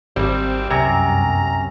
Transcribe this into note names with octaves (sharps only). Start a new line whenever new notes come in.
G#1 G3 C4
G1 C2 F#2 C3 C#4 A#5